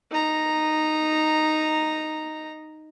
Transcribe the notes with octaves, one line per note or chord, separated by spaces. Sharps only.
D#4 A#5